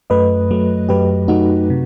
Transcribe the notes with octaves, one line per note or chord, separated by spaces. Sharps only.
F#2 F#3 A3 B4 D#5
F#2 F#3 A3
F#2 F#3 A3 G4 B4
F#2 F#3 A3 D#4 F#4
C3